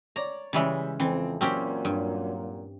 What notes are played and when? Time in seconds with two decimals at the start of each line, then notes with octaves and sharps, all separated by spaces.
0.16 C#5 D5 A#5
0.53 C#3 E3 G3 G#3 C#4 E5
1.00 F2 E3 C4
1.41 F#2 A#2 F#3 C4 C#4 G4
1.85 G2